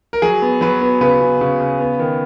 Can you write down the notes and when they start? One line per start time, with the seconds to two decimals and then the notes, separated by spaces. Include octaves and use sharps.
0.13 A#4
0.22 F#3 G#4
0.42 B3
0.61 F#3 B4
0.81 B3
1.01 C#3 B4
1.21 C#3
1.41 C#3
1.60 C#3
1.79 B3
1.99 D#3